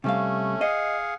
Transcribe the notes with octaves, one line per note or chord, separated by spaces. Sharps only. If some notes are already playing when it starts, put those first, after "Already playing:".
C3 G3 A3 C#4 F5
G#4 D#5 F5 F#5